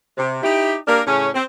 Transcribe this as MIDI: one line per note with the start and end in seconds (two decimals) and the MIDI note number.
0.17 0.39 48
0.43 0.75 63
0.43 0.75 64
0.43 0.75 67
0.87 1.01 58
0.87 1.01 62
0.87 1.01 67
0.87 1.01 70
1.07 1.29 45
1.07 1.29 49
1.07 1.29 61
1.34 1.43 60